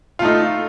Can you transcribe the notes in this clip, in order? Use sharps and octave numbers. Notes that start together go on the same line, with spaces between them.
A3 D#4 F4